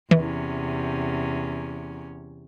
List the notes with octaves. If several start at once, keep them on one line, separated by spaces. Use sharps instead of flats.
E2 C3 E3 C#4